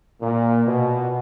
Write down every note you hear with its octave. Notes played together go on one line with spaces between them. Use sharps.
A#2
B2